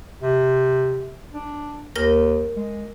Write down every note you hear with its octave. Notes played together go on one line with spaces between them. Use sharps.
C3
D4
D#2 A#4 A#6
G#3